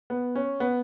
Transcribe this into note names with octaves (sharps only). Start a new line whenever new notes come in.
B3
C#4
B3